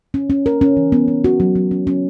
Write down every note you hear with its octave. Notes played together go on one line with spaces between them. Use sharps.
C#4
C#4
A#4
C#4
E3
B3
B3
F#4
F#3
F#3
C#4
C#4